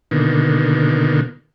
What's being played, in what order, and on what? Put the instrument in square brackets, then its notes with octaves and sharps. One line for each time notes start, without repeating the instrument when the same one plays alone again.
[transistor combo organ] B2 D3 D#3 A#3